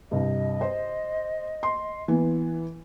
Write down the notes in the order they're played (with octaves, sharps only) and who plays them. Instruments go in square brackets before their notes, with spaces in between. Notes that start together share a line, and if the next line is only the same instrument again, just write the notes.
[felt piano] C2 G2 [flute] D#5
[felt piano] C5
C6
E3 B3